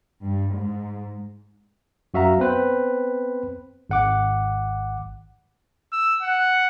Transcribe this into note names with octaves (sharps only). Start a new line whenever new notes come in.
G2
G#2
F#2 F#4 E5 F5 A#5
B3 C4 B4 C5
G#1 F#5 D6
E6
F#5